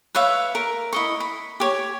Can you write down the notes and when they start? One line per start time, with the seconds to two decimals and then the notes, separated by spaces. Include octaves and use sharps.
0.15 B4 C#5 E5 F5
0.55 A#4
0.93 E4 D#5 C#6
1.20 B5
1.60 G4 C#5